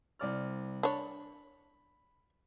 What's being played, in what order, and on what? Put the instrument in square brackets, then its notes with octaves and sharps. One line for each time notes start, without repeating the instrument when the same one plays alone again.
[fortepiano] C2 D5 F6
[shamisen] D4 C#5 [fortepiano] B5